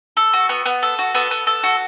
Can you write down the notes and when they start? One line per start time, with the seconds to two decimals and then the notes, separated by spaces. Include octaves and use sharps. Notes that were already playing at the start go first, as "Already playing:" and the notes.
0.17 A4
0.33 F#4
0.49 B3
0.66 B3
0.83 A4
0.99 F#4
1.14 B3 A4
1.31 B3
1.47 A4
1.63 F#4